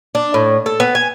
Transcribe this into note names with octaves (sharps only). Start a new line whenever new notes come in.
D4
A2
A4
B3
G#5